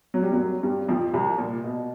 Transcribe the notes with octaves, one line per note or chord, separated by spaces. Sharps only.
F#3
G3
F#2 F#3
G2 G3
F2 F3
C2 C3
A#2
B2